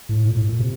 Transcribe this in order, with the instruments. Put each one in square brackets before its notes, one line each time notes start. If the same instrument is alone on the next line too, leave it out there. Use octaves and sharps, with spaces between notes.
[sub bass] A2
A#2
A2
A#2
C3